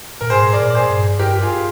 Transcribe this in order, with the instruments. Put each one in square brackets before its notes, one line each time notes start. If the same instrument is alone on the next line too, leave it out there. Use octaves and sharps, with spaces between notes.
[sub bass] A#2 [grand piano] A#4
[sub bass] G#2 [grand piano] G#4 C5
[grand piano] A#4 D5
[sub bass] A#2
[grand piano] D5
G#4 C5
[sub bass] G2
[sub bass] G2 [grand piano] G4 A#4
[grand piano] G4
F4 G#4